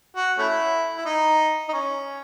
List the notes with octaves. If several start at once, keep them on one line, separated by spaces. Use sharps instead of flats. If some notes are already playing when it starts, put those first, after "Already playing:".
F#4
A3 C#4 E4
E4
D#4
D#4
C#4